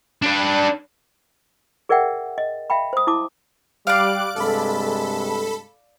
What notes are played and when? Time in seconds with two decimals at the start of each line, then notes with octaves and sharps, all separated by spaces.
0.22 D4 B4
1.89 G#4 A#4 D5 E5 F#5 G5
2.38 D#5
2.70 E5 F5 G5 B5
2.93 C5 D#6
3.07 E4 A5 D6
3.87 G3 D5 F5 D6 F#6 D7
4.36 G2 C3 G#3 A4 B5